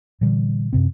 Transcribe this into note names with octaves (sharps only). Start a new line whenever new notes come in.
A#2 D3 E3 G3
F#2 C3 C4